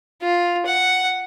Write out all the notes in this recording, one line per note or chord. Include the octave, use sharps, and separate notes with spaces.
F4
F#5